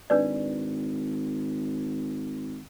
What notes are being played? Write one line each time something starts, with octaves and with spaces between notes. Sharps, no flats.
G#1 D4 B4 D5